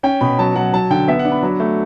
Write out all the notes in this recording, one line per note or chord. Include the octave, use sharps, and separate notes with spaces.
C#4 G5
B2 B5
F#3 A5
F#3 F#5
F#3 A5
D3 G5
B3 E5
F#5
D4
B5
F#3
A3